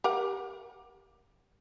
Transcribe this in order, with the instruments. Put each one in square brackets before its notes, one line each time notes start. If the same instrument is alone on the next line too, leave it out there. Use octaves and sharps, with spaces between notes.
[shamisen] G4 A#4 F#5